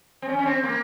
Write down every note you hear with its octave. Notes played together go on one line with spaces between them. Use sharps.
C4
C#4
C#4
C4
A#3